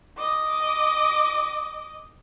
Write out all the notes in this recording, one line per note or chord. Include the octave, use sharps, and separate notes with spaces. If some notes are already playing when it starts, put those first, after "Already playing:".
D#5 D6